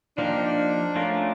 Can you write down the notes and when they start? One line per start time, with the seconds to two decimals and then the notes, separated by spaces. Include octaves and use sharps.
0.18 F3 A#3 D4 D#4 G4
0.95 A3 C#4 F4 A#4